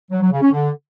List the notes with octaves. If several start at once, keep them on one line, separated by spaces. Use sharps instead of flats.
F#3
F#3
C#3
C#4
D3